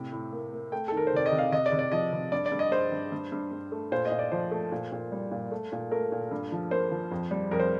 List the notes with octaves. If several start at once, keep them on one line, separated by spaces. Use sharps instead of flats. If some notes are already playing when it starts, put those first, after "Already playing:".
Already playing: A2 C3 G5
A2
A#3
A#3
A3 G5
D#3 A4
A#4
C5
C3 D5
D#5
C3
F5
C3 D#5
D5
C3
D5
F3 D#5
C3
G2 D5
D5
G2
D#5
G2 C5
G2
G2
G2
G2
A3
A#2 C5
D#5
A#2
D5
F3 C5
A3
A#2
A#2
G3
A#2
A3
A#2
A3 A#4
A#2
G2
F3
A#3 C5
F3
F2
G3
F2 A#4
C5